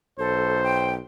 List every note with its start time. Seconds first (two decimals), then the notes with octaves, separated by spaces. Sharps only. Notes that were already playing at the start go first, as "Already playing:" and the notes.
0.19 B1 A4 C5
0.64 G5